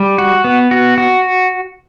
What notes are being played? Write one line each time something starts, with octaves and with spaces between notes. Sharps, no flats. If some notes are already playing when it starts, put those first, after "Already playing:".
Already playing: G3
F#4
B3
F#4
F#4